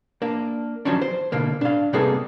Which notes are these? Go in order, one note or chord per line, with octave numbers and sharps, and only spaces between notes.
A#3 D4
D#3 F3 F#3 C#4 D4
C5
B2 D3 A#3
D4 F5
C3 G3 A#3 B3 G#4 A4